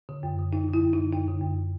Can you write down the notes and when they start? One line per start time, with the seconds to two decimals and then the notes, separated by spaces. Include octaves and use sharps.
0.09 D3
0.23 F#2
0.39 D3
0.53 F#2 D#4
0.69 D3 E4
0.83 F#2
0.93 D#4
0.98 D3
1.13 F#2 D#4
1.28 D3
1.42 F#2